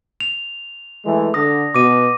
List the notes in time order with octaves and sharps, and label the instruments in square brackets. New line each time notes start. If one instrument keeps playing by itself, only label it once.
[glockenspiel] F7
[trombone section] E3 G#3 A3
[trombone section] D3 [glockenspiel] D#6 A#6
[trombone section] B2 [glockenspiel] D6 D#7